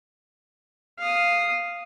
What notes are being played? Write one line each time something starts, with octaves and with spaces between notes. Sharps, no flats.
F5 D#6